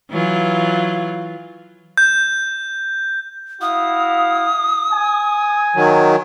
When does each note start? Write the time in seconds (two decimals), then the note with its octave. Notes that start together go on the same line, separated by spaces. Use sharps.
0.11 E3 F#3 F4
1.98 G6
3.61 E4 F#4 F5 D#6
4.93 G#5
5.76 D#3 F#3